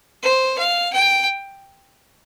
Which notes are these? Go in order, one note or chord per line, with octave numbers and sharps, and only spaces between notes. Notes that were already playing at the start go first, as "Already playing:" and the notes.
C5
F5
G5